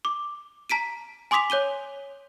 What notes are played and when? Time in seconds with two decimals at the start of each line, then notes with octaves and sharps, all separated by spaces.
0.05 D6
0.70 A5 A#5 B6 D7 D#7
1.31 G#5 C6 D6 D#6 B6 F7
1.50 C#5 G6 D#7 G7